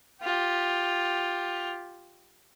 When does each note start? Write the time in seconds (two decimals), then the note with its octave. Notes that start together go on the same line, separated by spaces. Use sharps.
0.22 F4 G4